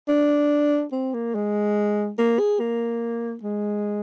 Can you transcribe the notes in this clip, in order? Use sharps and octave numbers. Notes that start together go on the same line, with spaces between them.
D4
C4
A#3
G#3
A#3
G#4
A#3
G#3